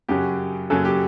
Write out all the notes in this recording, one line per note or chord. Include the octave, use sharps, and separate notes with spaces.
F#2 C#3 F#3 G4
F#2 C#3 F#3 A4
G4